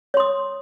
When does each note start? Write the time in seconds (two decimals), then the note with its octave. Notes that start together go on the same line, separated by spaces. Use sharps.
0.14 C#5
0.17 C6
0.20 D#6